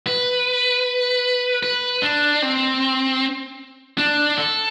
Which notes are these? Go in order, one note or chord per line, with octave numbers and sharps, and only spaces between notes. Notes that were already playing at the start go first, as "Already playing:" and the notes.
B4
B4
D4
C4
D4
A4